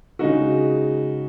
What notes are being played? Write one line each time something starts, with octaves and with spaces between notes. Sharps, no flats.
C#3 G#3 D#4 F#4